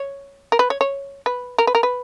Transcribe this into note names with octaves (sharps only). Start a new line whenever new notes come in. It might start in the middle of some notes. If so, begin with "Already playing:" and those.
Already playing: C#5
A#4
B4
C#5
C#5
B4
A#4
B4
A#4
B4